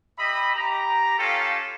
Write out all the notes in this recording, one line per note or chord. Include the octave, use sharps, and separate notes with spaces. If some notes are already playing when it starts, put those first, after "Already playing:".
G4 D#5 E5 B5
G4 A#5
C#4 F4 G4 A4 F5 G5